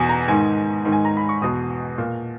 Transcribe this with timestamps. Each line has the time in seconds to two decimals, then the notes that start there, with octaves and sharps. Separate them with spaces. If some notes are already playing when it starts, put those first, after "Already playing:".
Already playing: E2 B2 G#5
0.09 A#5
0.28 G#2 D#3 G#5
0.85 G#2 D#3
0.92 G#5
1.05 A#5
1.17 B5
1.29 C#6
1.42 E2 B2 D#6
1.98 A#2